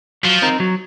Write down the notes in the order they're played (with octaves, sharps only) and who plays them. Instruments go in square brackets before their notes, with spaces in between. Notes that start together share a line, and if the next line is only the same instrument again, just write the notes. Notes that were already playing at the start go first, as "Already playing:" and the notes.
[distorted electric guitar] F3 [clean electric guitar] F#3
[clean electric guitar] C4 D#4 A#4
F#3